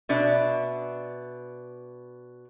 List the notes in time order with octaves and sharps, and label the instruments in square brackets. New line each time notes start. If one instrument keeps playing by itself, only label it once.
[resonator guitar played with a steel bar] B2 D4 E5